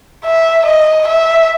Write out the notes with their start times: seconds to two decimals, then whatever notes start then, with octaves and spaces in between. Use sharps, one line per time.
0.25 E5
0.67 D#5
1.08 E5